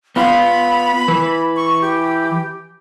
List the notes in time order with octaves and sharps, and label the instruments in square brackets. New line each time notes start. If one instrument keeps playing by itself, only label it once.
[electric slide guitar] B3 F4 [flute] B5
[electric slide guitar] E3 B4
[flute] C#6
G4